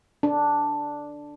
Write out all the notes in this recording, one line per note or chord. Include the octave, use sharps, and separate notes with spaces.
D4